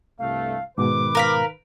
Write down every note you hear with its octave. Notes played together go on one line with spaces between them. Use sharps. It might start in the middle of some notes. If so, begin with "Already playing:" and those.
C2 G2 A3 F5
G#2 B2 D#3 B4 D6
A#4 F5 B5